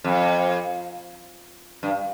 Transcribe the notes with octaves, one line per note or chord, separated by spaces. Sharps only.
F2
G2